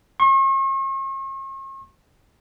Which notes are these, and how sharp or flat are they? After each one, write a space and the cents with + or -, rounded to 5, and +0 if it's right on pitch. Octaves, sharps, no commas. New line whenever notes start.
C#6 -45